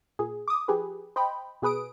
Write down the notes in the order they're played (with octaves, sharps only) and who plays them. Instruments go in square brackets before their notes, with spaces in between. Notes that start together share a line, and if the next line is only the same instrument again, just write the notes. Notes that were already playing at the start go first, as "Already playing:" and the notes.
[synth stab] A#2 G#4
D6 D#6
F3 G4 G#4 B4
C5 D#5 G5 B5
B2 G#4 B4 D#6 D7